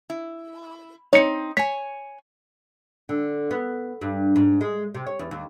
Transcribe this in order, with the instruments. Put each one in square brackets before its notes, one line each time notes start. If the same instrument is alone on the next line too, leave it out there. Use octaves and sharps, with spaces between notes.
[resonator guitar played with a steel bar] E4
[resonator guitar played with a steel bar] C4 D#4 [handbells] C#5 C#7
[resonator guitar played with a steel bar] C#5 G#5 [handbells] B6
[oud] D3
B3
G2
G#2
G#3
C3
C#5
E2
D#2